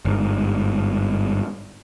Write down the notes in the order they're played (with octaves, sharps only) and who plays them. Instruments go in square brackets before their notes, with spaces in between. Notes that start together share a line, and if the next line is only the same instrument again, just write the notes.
[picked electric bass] G1 G#2